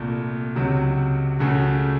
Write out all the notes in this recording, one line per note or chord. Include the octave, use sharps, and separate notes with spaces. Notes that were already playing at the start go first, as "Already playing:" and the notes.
Already playing: C2 A#2 A3
C#2 C3 F#3
C#2 C#3 A3 C#4 F#4